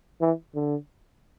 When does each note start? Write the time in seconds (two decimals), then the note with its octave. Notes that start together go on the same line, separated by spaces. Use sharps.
0.21 E3
0.55 D3